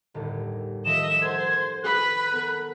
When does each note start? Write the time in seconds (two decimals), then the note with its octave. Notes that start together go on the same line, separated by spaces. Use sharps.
0.14 G1 D#2 A2
0.85 D#3 F3 A3 D#5 E5 E7
1.22 A4 C5 F#5 C6 G#6
1.83 B4 B5 F#6
2.31 B3 A4 A#4